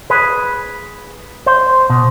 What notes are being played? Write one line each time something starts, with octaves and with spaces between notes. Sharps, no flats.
G#4 B4
C5
B2